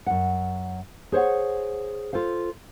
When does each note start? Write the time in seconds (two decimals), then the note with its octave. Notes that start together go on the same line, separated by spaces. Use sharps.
0.06 F#2 F#5
1.12 G#4 C5 C#5 F#5
2.13 F4 A4 C5 F5